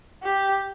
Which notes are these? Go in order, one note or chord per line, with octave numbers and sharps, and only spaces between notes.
G4